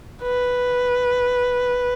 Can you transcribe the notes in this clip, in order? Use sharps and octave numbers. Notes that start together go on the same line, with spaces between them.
B4